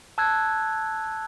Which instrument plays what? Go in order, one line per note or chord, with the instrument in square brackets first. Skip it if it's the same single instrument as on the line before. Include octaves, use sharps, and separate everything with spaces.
[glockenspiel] A5 E6 F#6 G#6